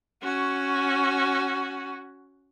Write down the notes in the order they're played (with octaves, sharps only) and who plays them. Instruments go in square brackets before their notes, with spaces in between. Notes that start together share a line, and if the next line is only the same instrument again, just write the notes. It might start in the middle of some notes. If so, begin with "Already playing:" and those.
[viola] C#4 F#4